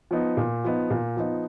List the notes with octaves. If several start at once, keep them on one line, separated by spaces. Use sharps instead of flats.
F3 B3 D#4
A#2
F3 B3 D#4
A#2
F3 B3 D#4